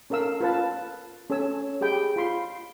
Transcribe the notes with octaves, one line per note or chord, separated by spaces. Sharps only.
C#4 A4 A#4 F5 E6
F4 B4 A5
C#4 A4 C#5 G#5 E6
G4 G#4 D#5 G5 B5
F4 B5 C6